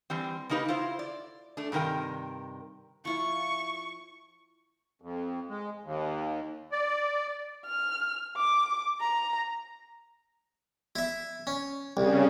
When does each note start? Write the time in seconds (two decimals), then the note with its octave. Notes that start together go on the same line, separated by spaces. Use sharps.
0.10 E3 G3 C4
0.49 C#3 A#3 D#4 G4 B4
0.68 E4 F4 C5
0.99 D5
1.57 A3 D4
1.72 G2 C3 D#3 A#4 G5
3.05 F3 E4 F4 C#6
5.02 F2
5.50 G#3
5.84 D#2
6.72 D5
7.66 F6
8.37 D6
9.00 A#5
10.96 E4 E5
11.47 C#4
11.97 C2 C#3